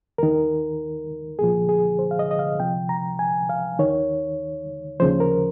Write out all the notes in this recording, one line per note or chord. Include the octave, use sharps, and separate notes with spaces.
D#2 D#3 A#4
C2 A#2 F3 G#4
G#4
C5
F5
D#5
D#5
F5
C#2 C3 F3 G5
A#5
G#5
F5
D#2 D#3 C#5
D#2 C#3 F3 C5
A#4